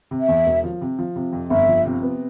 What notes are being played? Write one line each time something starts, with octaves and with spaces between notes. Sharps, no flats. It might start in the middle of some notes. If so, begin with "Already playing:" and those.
C3
E5
E2
E1
F3
C3
F3
C3
F2
G1 E5
F3
C3
B3